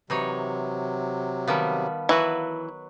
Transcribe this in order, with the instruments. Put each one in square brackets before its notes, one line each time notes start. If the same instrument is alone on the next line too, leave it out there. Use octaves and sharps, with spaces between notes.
[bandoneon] C3 F#3 [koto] E3 D#4 C#5
[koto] D#3 G3 B3 [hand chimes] F5 A5
[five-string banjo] E3 [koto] F#3 F#4 B4